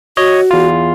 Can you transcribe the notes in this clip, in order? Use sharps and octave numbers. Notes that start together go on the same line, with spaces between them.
F#4 C#5 D#5
E2 F4